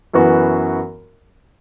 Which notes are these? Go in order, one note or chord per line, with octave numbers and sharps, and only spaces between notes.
F#2 E3 B3 F#4